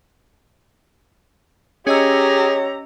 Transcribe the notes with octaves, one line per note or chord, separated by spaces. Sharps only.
C#4 G4 G#4 C#5 D#5 A#5 E6